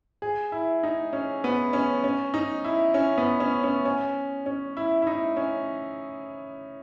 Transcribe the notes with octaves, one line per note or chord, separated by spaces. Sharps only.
G#4
E4
D#4
C#4
B3
C#4
C#4
D#4
E4
C#4
B3
C#4
C#4
C#4
C#4
E4
E4
D#4
C#4